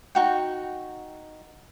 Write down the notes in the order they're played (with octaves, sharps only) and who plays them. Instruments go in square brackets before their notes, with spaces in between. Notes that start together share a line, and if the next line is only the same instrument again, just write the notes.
[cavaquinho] D#4 F#4 G5